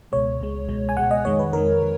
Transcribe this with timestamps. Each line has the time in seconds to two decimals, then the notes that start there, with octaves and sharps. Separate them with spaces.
0.12 C#2 B2 G#3 C#5
0.40 C#2 B2 G#3
0.68 C#2 B2 G#3
0.89 G#5
0.97 C#2 B2 G#3 F#5
1.11 D#5
1.25 F2 D#3 G#3 C#5
1.39 B4
1.53 F2 D#3 G#3 A#4
1.82 D#3